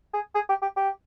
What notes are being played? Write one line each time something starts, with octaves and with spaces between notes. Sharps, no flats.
G#4
G#4
G4
G4
G4